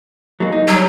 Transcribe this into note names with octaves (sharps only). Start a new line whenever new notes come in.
F#3 G#3 A#3
D#4
F#3 G3